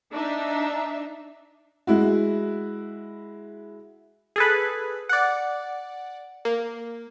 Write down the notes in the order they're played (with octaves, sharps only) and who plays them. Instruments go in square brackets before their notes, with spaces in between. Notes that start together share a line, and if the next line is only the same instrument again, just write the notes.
[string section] D4 D#4 E5
[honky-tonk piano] G#3 E4 F#4
[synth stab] G#4 A4 B4
D5 F#5
A#3